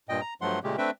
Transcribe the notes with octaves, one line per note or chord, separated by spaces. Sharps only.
G2 A#2 D#5 G5
A#5
G2 F3 F#3 A3 F#5 C6
A#2 C#3 G#3 A3 G4
A3 C4 D4 B4 E5 G5